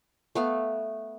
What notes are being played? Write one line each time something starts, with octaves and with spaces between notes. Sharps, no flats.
A3 B3 F5